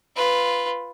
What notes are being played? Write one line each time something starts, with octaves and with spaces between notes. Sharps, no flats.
F4 B4